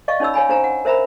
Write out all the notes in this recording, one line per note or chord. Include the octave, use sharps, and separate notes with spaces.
D5 D#5 F5 C#6
C#4 D#4 C#5 B5 E6
C#5 F5 G#5 B5
D4 C5 F5 G#5 A#5
F#5
A#4 C5 E5 A#5 B5